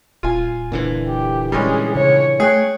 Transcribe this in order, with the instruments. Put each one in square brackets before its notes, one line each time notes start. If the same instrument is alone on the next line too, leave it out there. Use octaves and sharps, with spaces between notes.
[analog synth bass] D#1 [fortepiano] F4 G#5
[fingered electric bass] A#2 D3 E3
[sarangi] G4
[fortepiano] G3 G#3 C#4 [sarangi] G#4
[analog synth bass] C#3 [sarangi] C#5
[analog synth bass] A3 [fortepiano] G#4 G5 F#6 [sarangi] C#5